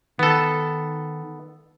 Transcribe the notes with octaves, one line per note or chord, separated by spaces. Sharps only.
D#3 B3 A4